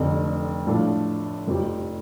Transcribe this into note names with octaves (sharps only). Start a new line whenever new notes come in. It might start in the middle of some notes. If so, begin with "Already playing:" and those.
Already playing: F1 F2 D3
A2 F3 D4 F4 A4
F1 F2 F3 C4 G4